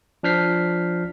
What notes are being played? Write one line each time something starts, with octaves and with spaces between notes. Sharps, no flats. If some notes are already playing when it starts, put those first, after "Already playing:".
F3 D4 F6 G6 B6 C7